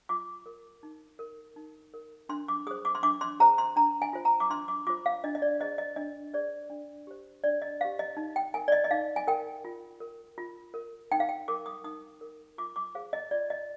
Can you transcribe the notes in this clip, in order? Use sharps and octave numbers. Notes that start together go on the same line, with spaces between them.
F4 D6
A#4
D#4
A#4
D#4
A#4
D4 C6
D6
G#4 C5 D#6
D6
C6
D4 D6
C6
G#4 C5 A#5
C6
D4 A#5
G#5
F4 C5
A#5
D6
D4 C6
D6
F4 C5 D6
F5
D4 D#5
D#5
D5
G#4 C5 D#5
D#5
D4 D#5
G#4 C5 D5
D4
G4 C5
D4 D5
D#5
G4 C5 F5
D#5
D#4
G5
A#4 G#5
D5
D#5
D#5
D#4 F5
G#5
A#4 G5
F4
A#4
F4
A#4
D#4 G5
F5
G5
A#4 D6
D#6
D#4 D#6
A#4
F4 D6
D6
G#4 C5 F5
D#5
F4 D5
D#5